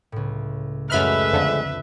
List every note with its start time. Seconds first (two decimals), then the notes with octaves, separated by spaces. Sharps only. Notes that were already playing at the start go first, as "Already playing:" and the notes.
0.12 C#2 A2
0.90 F#2 G#3 A3 B4 E5 B5 F6
1.33 F2 D3